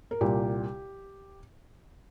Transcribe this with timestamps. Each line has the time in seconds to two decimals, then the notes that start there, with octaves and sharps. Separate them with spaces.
0.11 A#4
0.21 C2 A#2 G4